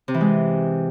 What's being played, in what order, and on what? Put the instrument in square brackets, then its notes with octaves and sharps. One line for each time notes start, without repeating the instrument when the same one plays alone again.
[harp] C3
E3
G#3